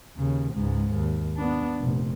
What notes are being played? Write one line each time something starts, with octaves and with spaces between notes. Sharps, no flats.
D#2 C#3
C#2 G#2
D#2
B3 D4
F1 A#2